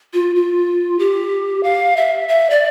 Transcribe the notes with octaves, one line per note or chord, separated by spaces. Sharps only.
F4
F4
G4
F5
E5
E5
D5